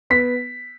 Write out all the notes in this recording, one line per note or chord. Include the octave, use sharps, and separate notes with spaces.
B3 B6